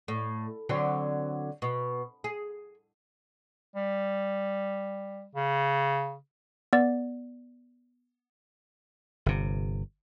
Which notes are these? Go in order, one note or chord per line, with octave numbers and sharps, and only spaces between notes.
A2
D3 F#3 C4
B2
G#4
G3
C#3
B3 D5
G1 C3